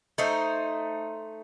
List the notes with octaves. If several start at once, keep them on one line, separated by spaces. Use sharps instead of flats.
A3 D#4 C5